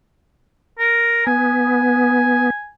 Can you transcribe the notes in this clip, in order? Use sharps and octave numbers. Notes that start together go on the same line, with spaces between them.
A#4
B3 G#5